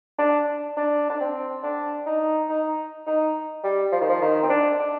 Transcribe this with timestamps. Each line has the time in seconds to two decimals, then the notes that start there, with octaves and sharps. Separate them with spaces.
0.19 D4
0.77 D4
1.10 D4
1.20 C4
1.63 D4
2.07 D#4
2.49 D#4
3.07 D#4
3.64 G3
3.92 F3
4.01 D#3
4.09 F3
4.22 D#3
4.42 C4
4.50 D4
4.79 D4